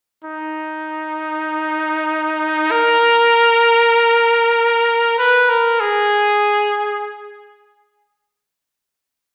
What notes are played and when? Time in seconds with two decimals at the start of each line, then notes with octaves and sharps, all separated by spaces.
0.25 D#4
2.71 A#4
5.18 B4
5.49 A#4
5.80 G#4